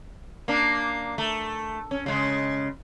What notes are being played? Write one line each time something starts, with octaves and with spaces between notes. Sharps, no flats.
A#3 D4
A3
C#4
C#3 G#3